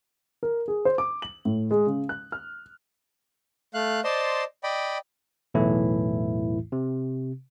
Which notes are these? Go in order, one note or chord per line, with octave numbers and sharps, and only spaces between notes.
A#4
G#4
C5
D6
F#7
A2
G#3
C#3
F#6
F6
A3 F5 F#6
C5 D5 D#5 A5 C6
D5 D#5 G5 B5
B1 E2 A2 E3 A3 E4
C3